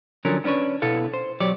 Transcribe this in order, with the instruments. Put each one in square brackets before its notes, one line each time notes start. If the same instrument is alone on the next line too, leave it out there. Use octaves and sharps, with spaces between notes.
[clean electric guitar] D3 F3 F#3 C#4 D4 A#4
B3 C#4 D4 B4 C#5
B2 B3 E4 A4 F5
C5
B1 F#3 G4 C#5 D5